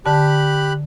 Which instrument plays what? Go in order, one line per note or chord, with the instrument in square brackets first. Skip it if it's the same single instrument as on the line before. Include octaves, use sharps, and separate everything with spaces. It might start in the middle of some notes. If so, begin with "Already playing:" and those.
[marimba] D3 A5 [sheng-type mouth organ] G4 B5 F#6